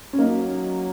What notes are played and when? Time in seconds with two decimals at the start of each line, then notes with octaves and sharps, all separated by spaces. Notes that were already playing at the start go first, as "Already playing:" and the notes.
0.13 C#4
0.18 F#3 A#3 D#4